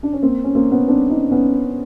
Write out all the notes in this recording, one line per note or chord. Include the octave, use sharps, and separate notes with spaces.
D4
C#4
A#3 C4
C#4
A#3 C4
B3 C#4
C4 D4
C#4 D#4
B3 C#4